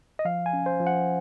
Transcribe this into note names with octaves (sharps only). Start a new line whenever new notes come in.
D#5
F3 F5
G#5
C#4
C5
F3
F#5